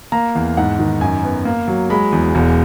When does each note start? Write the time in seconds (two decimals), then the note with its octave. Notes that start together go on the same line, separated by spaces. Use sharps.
0.12 A#3 A#5
0.35 E2
0.57 G#2 F#5
0.79 D#3
1.01 F#2 G#5
1.23 B3
1.45 A#3
1.68 F#3
1.90 G#3 B5
2.12 E2
2.35 E1